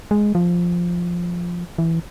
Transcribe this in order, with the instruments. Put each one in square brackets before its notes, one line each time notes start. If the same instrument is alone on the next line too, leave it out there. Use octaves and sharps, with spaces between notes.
[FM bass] G#3
F3
E3